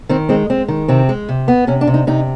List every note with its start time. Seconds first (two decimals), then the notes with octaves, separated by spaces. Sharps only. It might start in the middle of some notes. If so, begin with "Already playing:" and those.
0.09 D#3 C4
0.29 G#3 C4
0.50 G#3 C4
0.68 D#3
0.88 C3 C4
1.09 G#3
1.29 C3
1.48 B3
1.67 C3 C#4
1.81 D4
1.87 C3
1.94 D#4
2.07 C3 D#4